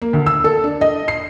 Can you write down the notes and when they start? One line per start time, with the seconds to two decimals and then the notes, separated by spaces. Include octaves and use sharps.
0.02 A#3
0.13 D2
0.26 E6
0.44 A4
0.64 D4
0.81 D#5
1.08 C7